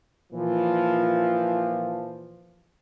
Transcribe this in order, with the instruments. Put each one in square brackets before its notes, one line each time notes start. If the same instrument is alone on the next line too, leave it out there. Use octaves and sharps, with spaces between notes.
[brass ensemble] A#2 E3 F3